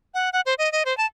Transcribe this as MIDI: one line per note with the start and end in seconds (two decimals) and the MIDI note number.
0.14 0.30 78
0.33 0.41 78
0.46 0.54 72
0.58 0.71 75
0.72 0.83 75
0.85 0.96 72
0.97 1.06 81